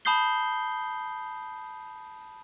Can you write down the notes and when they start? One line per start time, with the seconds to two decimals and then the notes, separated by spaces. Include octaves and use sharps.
0.05 A5 B5 D#6 G6 C7 G7